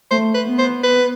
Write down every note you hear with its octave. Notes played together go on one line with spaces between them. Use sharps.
A3 C5
B4
B3
C5
B4